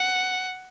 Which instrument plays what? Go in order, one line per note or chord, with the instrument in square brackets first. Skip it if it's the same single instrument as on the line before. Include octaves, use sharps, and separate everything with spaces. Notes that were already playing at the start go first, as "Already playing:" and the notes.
Already playing: [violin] F#5